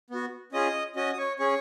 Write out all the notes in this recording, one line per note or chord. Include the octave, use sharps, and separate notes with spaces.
B3 F#4
C#4 F4 G#4 D#5 D#6
C#4 F#4 D#5 D#6
D#6
C#5 C#6
C#4 G#4 C#5 C#6